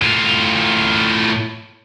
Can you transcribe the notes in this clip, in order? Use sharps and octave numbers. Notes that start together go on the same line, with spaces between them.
A2 F4